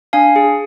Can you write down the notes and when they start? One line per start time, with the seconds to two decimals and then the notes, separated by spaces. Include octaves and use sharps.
0.13 D4 F5 G#5
0.36 G#4